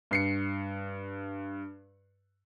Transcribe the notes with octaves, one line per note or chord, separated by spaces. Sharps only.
G2 C7 C#7